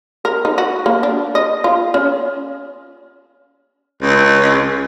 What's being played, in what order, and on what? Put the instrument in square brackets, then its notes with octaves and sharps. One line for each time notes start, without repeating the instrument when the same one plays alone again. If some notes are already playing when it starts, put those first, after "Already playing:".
[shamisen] A#4
D#4
F#4
A#3
D4
D#5
F4
C#4
[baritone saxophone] C#2